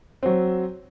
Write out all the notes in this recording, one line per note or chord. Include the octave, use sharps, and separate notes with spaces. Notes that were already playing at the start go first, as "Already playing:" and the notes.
F#3 C4